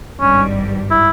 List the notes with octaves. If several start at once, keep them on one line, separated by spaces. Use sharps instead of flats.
G#1 G2 G3 C#4
E4